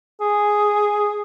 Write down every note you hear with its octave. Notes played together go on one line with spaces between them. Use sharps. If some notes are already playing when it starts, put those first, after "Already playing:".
G#4